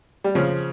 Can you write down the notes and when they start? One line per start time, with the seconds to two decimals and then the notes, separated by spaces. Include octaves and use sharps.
0.24 G3
0.35 C#3 F3